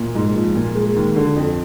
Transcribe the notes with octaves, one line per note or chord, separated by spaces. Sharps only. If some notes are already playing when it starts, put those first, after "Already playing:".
Already playing: A#2
G#2
F3
A#2
G#3
D#2
D3
F2